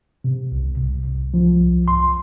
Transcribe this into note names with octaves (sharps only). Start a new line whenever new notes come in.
C3
C2
C2
C2
F3
C2
C2 C6